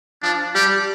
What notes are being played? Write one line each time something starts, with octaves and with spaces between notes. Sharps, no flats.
F3 D4
G3 G4